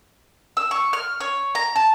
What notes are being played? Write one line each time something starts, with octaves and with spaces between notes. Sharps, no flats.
E6
C#6
F6
C#5
A#5
A5